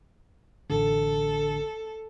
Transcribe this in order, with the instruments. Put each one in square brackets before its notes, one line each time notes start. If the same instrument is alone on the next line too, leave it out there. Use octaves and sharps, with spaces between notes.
[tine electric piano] A1 D3 [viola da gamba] A4